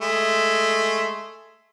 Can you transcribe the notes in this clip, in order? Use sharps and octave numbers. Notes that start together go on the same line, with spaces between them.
G#3 A3